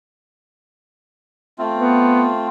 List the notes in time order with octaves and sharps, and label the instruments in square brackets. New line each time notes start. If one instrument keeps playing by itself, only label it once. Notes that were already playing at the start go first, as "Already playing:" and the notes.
[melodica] A3 C4 F4
[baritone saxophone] B3